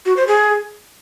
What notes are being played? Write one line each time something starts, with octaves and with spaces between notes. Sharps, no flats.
F#4
C5
G#4